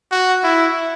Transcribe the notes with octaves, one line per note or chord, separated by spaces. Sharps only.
F#4
E4